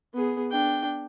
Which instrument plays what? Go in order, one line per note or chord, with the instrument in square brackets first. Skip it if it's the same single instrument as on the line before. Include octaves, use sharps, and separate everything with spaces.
[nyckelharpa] B3 G#4
D4 G5